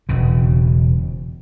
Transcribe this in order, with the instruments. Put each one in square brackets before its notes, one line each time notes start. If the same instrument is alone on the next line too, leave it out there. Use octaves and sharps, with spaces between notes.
[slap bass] E1 C#3